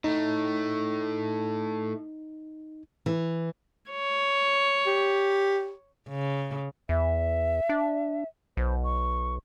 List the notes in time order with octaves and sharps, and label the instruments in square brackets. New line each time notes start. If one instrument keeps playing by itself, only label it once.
[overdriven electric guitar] A2 A3 [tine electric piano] D#4
[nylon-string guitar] E3
[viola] C#5
[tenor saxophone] G4
[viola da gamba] C#3
[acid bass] E2 [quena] E5
[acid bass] D4
[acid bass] B1 [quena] C5
[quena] C#6